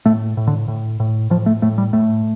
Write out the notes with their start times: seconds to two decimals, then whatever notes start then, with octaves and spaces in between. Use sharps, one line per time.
0.06 A2 A3
0.37 A2
0.47 D3
0.68 A2
1.00 A2
1.30 A2 F3
1.46 A3
1.62 A2 A3
1.78 G3
1.93 A2 A3